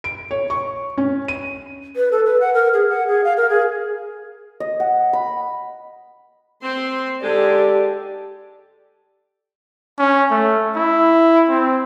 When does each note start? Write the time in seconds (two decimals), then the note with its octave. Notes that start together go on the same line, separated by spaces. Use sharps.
0.04 D7
0.31 C#5
0.50 C#6
0.97 C#4
1.28 D#7
1.96 B4
2.12 A4
2.25 B4
2.41 F#5
2.54 A#4
2.73 G#4
2.89 F#5
3.07 G#4
3.24 F5
3.37 A#4
3.49 G#4
4.60 D#5
4.80 F#5
5.13 B5
6.63 C4 C6
7.23 G#2 D3 G#3 G4 A4 D5
9.99 C#4
10.31 A3
10.76 E4
11.49 C4